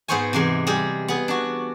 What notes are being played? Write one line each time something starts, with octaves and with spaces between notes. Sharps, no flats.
G#2 B3 G#4 C5 C#5 G#5
C3 E3 G#3
G3 G#3 G#4
B3 G#4
D4 F#4